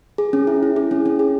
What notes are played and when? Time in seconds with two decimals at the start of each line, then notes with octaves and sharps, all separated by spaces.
0.18 G#4
0.33 C#4
0.47 E4
0.63 E4
0.76 G#4
0.91 C#4
1.06 C#4
1.19 G#4